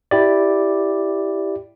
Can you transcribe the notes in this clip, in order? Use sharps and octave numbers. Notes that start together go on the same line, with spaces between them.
E4 G4 D5